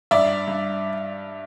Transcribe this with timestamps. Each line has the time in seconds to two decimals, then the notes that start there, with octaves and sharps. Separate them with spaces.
0.11 G2 D5 E5
0.48 G2